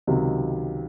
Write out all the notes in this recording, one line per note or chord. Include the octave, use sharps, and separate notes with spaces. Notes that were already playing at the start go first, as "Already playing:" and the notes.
C#2 C3 D#3 F#3